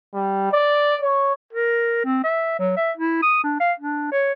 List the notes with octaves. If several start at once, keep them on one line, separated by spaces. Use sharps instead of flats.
G3
D5
C#5
A#4
C4
E5
F#3
E5
E4
D#6
D4
F5
D4
C#5